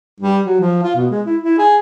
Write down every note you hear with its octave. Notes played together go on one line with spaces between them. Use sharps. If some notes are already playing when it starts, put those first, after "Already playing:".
G3
F#3
F3
F4
B2
G#3
E4
E4
G#4